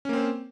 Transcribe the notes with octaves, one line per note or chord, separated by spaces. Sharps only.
A#3 C4 C#4 C5